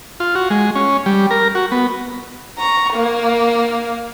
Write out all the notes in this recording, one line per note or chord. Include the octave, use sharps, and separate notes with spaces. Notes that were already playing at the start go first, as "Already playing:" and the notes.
F4
F#4
G#3
C#4
G3
A#4
F#4
B3
A#5 C#6
A#3 F5